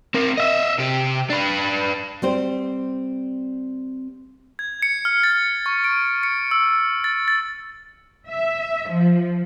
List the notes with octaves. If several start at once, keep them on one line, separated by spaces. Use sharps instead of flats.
C4 A#4
D#5 E5
C3 G4
D4 B4
G3 C4 C5
G#6
C#7
F6
A6
C#6
D7
C#7
E6
A6
A6
E5
F3